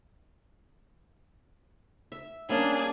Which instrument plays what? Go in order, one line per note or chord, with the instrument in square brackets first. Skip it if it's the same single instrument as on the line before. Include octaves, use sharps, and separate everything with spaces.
[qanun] E5
[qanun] G3 A#3 C#4 [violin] D4 G#4